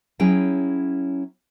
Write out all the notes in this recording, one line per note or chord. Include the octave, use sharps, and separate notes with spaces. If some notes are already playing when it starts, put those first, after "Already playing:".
F#3 C#4 E4 G#4 G5 G#5